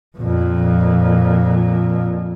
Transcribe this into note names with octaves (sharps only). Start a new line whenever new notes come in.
F2 A#2